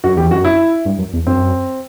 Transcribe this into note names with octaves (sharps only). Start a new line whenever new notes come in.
F#2 F#4
E2 G4
F#2 F#4
E4
G2
F#2
E2
F#2 C4